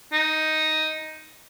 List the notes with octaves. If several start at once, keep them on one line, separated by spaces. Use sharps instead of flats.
D#4